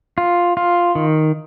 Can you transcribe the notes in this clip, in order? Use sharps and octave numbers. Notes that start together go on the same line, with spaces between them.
F4
F4
D#3